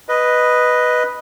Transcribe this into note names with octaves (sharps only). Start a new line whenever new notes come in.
B4 D#5